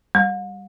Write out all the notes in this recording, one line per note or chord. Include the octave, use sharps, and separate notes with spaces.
G3